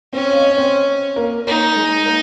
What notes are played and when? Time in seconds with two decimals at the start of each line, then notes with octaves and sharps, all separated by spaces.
0.13 C4 C#4 C5
0.31 F5
0.39 D#5
0.49 C#5
0.57 C4 C5
1.16 A#3 A#4
1.47 A#3 D#4 A#4
1.76 G#3 G#4
2.06 A#3 A#4